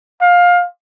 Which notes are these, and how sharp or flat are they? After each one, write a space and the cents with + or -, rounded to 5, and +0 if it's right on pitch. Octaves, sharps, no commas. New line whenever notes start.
F5 +20